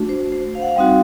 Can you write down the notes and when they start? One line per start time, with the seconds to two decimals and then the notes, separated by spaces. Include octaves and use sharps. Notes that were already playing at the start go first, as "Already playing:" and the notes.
Already playing: A3 D4 F#4
0.09 C5
0.32 C5
0.55 F5
0.62 F#5
0.68 F5
0.76 G3 C4 D#4 F#4